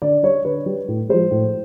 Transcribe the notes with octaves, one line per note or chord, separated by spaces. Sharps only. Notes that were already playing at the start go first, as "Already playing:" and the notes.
D3 D5
G3 C#5
D3 B4
G3
A2
F3 G#3 C5
A2